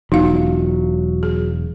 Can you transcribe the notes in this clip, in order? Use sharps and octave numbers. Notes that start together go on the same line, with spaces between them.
E1 F#3 D#4 F4 F5
G#4